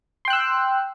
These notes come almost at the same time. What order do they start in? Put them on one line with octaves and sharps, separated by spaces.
C6 G5 F#6 E6